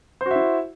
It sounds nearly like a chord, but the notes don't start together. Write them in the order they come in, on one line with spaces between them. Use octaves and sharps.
C5 F#4 E5 E4